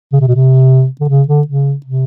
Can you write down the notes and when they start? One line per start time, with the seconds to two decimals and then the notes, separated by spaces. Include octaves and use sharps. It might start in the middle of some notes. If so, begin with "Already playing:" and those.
0.12 C#3
0.21 C3
0.28 B2
0.35 C3
1.01 D3
1.09 C#3
1.28 D3
1.47 C#3
1.86 C3